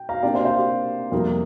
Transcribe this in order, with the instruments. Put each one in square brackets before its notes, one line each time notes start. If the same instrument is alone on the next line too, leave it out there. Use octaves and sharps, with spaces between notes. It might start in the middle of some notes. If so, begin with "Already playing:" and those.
Already playing: [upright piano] G5
F5 A#5
C3 A#3 D4 D5 G5
C5 F5
C5 F5
G4
F2 C3 G3 A#3 A#4